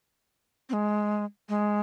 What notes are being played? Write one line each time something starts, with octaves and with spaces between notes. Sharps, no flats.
C4
G#3
G#3